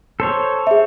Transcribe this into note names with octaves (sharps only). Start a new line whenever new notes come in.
A4 C5 C#5
G#4 E5